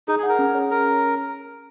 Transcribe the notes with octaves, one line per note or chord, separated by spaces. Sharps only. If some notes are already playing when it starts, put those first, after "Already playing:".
D#4 G#4
G#4
F#5
A#4
C#4
G#4 C#5
C#4 A#4